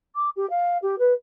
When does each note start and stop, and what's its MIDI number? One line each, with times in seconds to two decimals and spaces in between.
0.15 0.29 86
0.36 0.48 67
0.50 0.78 77
0.82 0.95 67
0.99 1.13 71